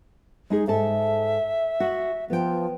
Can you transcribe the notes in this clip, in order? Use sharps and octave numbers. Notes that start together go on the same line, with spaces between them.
G#3 D#4 G#4
G#2 A4 E5 A5
F#4 F#5
F3 B3 G5